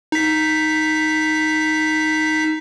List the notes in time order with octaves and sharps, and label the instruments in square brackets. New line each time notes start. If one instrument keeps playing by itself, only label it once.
[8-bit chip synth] D#4 B6